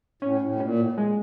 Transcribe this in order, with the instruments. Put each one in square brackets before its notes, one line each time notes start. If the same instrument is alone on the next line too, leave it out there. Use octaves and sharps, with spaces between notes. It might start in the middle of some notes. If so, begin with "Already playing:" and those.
[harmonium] A2 [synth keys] C#4
[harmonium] A2
B2
[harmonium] A#2 [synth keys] C#4
[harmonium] A2
A2
[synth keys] G#3